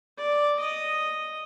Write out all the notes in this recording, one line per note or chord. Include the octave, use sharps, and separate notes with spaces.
D5
D#5